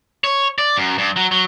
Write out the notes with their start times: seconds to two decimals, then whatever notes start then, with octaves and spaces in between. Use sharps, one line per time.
0.24 C#5
0.58 D5
0.77 F#2
0.98 G2
1.16 F#3
1.31 F#3